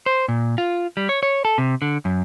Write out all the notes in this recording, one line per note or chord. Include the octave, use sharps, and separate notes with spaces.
C5
A#2
F4
G3
C#5
C#5
A4
C3
D3
F#2